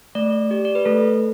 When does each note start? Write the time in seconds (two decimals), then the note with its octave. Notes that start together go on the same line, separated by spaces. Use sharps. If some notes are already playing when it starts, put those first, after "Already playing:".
0.15 A3 D5
0.51 G4 D5
0.65 D5
0.75 B4
0.85 A3 A4